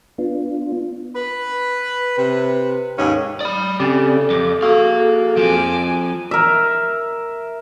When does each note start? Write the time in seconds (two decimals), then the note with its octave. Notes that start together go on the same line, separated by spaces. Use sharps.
0.18 B3 D4 F4
1.16 B4
2.18 C3 B4
2.98 D#2 G#2 G#3 C#4
3.41 D5 B5 D#6
3.80 C#3 A3 C4 G4 D5
4.30 F2 D6
4.63 A#3 F#4 G#4 A4 F5
5.37 F3 C4 G#5 D6
5.84 G#5
6.31 A#4 E5